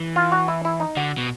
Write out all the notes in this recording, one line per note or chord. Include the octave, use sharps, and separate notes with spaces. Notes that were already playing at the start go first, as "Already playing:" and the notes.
Already playing: E3
F4
F#4
E4
E4
D#4
D3 F#4
B2